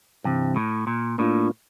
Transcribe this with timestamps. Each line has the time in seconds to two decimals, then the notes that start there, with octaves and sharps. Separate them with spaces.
0.24 G2 C3 E3 G3 C4
0.56 A2
0.87 A#2
1.18 A2 A#3 D4 F4